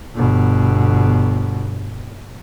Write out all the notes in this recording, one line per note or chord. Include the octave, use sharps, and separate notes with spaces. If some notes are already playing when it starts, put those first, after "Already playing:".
G1 B2